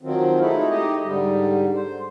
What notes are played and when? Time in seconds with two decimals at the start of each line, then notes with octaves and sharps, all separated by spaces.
0.03 D#3 F3 F#3 C4
0.39 G#3 A3 D#4 E4
0.70 D#4 G4 D#5
1.04 G#2 D3 G3
1.75 C5